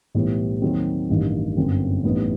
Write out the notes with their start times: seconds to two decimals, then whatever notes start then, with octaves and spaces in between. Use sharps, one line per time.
0.15 B1 A2 E3 G3 B3
0.62 D#2 D#3 F#3 C4
1.10 A1 G2 D#3
1.57 G1 F#2 F#3 C4
2.04 A1 A2 G3 B3 D#4